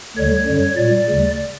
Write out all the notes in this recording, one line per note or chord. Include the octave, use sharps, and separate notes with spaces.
D2 D3 G3 C#5
F#2 D3 G3
A#2 G3 D5
D2 C#3 G3